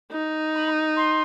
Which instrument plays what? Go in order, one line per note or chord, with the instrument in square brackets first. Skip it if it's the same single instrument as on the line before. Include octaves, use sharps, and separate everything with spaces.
[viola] D#4
[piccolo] B5
C6